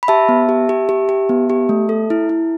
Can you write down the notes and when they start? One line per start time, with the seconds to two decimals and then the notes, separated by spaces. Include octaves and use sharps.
0.03 B5
0.08 G4 E5 A5
0.29 B3
0.49 G4
0.69 G4
0.89 G4
1.09 G4
1.29 B3
1.50 G4
1.69 A3
1.89 A4
2.10 E4
2.29 E4